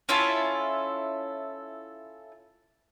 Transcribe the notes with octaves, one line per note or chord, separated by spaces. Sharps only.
C#4 E4 F4 A4